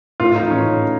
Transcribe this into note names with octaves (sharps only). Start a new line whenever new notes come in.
A2 F4
D#4
E3
C#4
A2